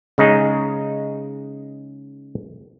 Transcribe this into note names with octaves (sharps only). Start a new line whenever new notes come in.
C#3 G#3 D#4 G#4